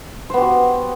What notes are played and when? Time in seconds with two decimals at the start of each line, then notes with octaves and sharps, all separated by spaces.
0.30 C5
0.34 B3
0.38 G4
0.42 F#4